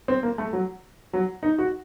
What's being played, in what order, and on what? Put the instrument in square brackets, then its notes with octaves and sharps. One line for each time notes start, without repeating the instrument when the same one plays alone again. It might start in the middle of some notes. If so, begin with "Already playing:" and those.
[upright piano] C4
A#3
A3
F#3
F#3
D#4
F#4